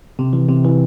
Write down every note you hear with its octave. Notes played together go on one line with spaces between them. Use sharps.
C3
E3
C3
E3